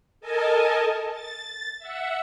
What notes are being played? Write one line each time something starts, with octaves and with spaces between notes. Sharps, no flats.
A4 A#4 D#5 G#5 A5
A6
E5 F#5